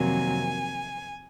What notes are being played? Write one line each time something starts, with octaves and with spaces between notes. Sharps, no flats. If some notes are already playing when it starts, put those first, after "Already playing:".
Already playing: F2 C3 D#3 F#3 A#3 G#5